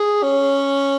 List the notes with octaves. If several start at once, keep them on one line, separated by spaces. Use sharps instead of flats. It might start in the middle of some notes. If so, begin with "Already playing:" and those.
Already playing: G#4
C#4